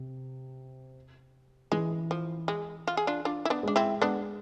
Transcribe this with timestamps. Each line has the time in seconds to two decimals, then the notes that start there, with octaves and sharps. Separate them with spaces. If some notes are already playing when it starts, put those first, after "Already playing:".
Already playing: C3
1.72 E3 G#3
2.11 F3
2.48 G#3
2.87 F4
2.97 G#4
3.07 D4 F4
3.25 D4 F4
3.45 E4
3.50 B3 D4
3.63 G#3 D4
3.76 C4 E4
4.02 G#3 B3 D4